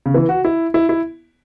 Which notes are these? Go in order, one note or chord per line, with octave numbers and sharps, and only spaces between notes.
C#3
E3
F#4
E4
E4
E4